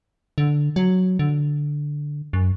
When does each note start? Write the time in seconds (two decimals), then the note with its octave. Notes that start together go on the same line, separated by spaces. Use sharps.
0.38 D3
0.76 F#3
1.19 D3
2.33 F#2